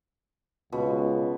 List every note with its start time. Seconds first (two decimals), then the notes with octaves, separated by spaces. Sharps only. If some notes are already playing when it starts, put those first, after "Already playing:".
0.72 C#2 B2